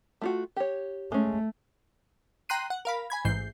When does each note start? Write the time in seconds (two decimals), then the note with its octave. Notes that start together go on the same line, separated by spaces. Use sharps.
0.21 A3 F4 F#4
0.56 G4 C#5
1.12 G#3 A3 C#4
2.49 G5 A#5 C6 F#6 C7 D#7
2.70 F#5
2.85 A#4 F5 B5
3.10 G#5 B5 G#6
3.25 A1 G#2 E3 G6 C7